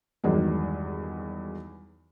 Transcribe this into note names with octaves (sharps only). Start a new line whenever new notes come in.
E2 G2 D#3 F#3 G#3